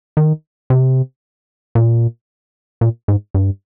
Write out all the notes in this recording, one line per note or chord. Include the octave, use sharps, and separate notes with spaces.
D#3
C3
A#2
A#2
G#2
G2